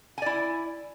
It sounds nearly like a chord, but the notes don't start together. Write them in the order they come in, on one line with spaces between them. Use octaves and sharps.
G#5 D5 E4